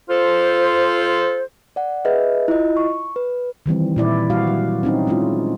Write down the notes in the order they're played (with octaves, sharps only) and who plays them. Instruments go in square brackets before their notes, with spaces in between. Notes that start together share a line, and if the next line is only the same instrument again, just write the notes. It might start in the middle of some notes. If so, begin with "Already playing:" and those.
[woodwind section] F4 A4 C5
[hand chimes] D5 F#5
G#4 B4 D#5 E5
E4 F4 D#5
C#6
B4
[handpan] D#3 E3 G3 C4
A#2 E4 D5
G3 F#4 F5
F#3
C4 C#4 D#4
G#3 C#4 E4 F4